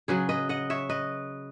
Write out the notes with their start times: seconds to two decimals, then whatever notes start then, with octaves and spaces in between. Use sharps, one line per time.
0.08 C#3 F#3 G#4 B4
0.29 B4 D#5
0.49 D#5 F#5
0.70 C#5 E5
0.89 B4 D#5